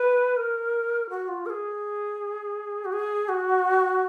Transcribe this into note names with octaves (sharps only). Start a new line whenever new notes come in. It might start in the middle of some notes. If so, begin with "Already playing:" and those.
Already playing: B4
A#4
F#4
F4
A#4
G#4
F#4
G#4
F#4